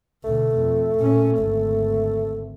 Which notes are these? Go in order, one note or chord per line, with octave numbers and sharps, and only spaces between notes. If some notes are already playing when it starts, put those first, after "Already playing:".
D2 B2 A3
F2
A#2 C#4
G#1 D2